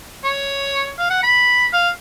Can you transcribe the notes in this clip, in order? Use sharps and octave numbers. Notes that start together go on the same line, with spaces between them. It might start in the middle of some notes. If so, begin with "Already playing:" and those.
C#5
F5
F#5
B5
F5